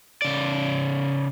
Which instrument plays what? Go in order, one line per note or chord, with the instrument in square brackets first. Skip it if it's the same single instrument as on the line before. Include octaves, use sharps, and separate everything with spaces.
[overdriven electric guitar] C#3 D5